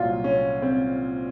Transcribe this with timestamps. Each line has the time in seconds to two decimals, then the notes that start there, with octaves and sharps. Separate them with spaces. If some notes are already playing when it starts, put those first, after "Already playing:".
Already playing: C2 A#2 F#3 F4
0.24 C#4
0.62 C4